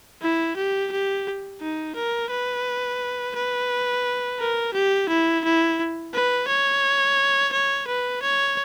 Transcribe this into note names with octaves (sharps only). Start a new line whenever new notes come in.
E4
G4
G4
D#4
A#4
B4
B4
A#4
G4
E4
E4
B4
C#5
C#5
B4
C#5